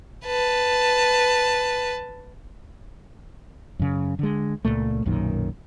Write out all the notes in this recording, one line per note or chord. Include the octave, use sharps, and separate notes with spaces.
B4 A5
F#2 C#3
D3 G#3
C#2 G2 A#2 A3
B1 F#2 A#2 D#3